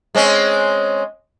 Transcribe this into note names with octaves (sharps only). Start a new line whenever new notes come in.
G#3 C4 C#4